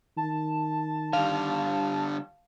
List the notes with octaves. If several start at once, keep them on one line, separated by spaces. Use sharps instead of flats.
D#3 A5
D3 G3 F5